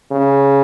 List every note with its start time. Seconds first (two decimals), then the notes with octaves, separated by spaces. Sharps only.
0.12 C#3